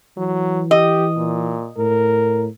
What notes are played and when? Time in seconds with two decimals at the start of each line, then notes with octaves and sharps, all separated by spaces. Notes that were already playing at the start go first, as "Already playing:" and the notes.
0.17 E3 F#3
0.71 G4 D#5
1.17 A#2
1.77 A2 A#4